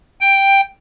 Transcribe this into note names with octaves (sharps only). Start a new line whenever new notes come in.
G5